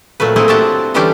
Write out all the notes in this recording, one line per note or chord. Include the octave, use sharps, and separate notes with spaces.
A#2 F#3 A3 B4
A3 A#3 C4 E4 G#4
C4 D4 F#4 G4 A5 A#5
D3 E3 G3 C#4 D4 G4